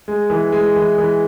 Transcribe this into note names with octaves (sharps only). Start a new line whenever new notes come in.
G#3
E3
G#3
E3
E3